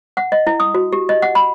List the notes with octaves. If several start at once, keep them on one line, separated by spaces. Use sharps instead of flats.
F#5
D#5
E4
D#6
F#4
G4
D#5
F#5
B5